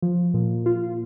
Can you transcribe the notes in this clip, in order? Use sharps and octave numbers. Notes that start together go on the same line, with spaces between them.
F3
A#2
F4